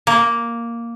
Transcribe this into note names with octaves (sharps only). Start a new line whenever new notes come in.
A#3